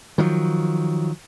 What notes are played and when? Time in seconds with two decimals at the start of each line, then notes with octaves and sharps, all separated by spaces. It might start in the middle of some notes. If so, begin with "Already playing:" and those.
0.18 D#3 F3 F#3